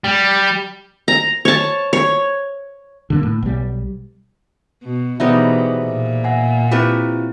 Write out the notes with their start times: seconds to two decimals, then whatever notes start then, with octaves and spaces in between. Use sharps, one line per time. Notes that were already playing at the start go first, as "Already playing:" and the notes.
0.04 G3
1.08 A#5
1.45 C#5 A5
1.93 C#5
3.10 D3 A3 A#3
3.23 A2
3.43 B1 G3
4.83 B2
5.20 B2 E3 G3 B3 D#4 G#4 C5 E5
5.85 A#2
6.24 E5 F#5 G#5
6.71 C4 E4 F4 G4 B4 E5